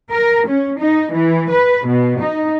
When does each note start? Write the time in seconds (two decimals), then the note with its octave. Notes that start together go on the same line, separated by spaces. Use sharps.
0.11 A#4
0.46 C#4
0.79 D#4
1.12 E3
1.50 B4
1.86 B2
2.20 D#4